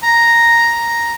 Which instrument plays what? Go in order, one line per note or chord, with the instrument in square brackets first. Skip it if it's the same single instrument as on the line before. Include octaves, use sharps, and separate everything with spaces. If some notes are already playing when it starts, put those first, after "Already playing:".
[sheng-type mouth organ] A#5